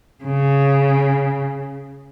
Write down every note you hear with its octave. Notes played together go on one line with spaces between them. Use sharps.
C#3